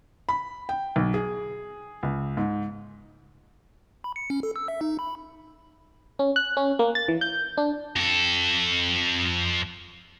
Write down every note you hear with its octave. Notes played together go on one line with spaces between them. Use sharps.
B5
G5
B1
G#4
C#2
G#2
B5
C#7
C#4
A4
E6
E5
D#4
B5
C#4
F#6
C#4
A#3
A6
E3
G6
D4
F2 A4